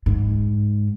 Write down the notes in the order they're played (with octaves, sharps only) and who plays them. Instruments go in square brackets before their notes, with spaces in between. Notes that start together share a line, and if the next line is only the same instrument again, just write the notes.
[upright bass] G#2